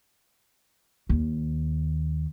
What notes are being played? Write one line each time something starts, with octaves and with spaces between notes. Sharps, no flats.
D#2